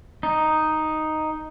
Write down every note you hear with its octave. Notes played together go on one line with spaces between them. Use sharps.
D#4